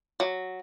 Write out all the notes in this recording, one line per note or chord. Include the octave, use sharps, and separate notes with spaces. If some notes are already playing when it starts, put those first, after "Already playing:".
F#3